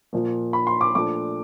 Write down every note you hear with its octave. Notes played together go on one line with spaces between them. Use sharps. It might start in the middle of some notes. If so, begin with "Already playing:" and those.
A#2 F3 A#3
B5
C6
D6
A#2 F3 A3 D4 D6